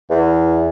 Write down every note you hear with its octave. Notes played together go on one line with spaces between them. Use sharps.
E2